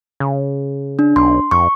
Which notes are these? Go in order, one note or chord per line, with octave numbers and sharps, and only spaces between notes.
C#3
D4
B1 C6
F2 C#6